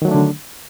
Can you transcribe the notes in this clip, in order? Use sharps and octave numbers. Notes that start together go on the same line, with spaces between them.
D3 D#3 F#3 A3 D4